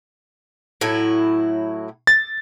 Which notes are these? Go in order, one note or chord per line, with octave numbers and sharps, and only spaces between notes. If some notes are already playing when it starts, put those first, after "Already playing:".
A2 F#3 E4
A6